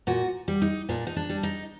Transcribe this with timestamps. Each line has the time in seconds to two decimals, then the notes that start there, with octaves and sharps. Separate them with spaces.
0.07 A#2 F#4
0.48 G3
0.62 D#4
0.89 A#2 D4
1.07 D#4
1.16 D4
1.29 G3
1.43 D#4